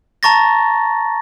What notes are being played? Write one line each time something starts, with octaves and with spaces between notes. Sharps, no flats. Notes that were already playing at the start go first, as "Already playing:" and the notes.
A5 A#5 C#6 A6 A#6